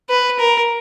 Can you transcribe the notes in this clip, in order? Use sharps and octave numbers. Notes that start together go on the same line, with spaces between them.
B4
A#4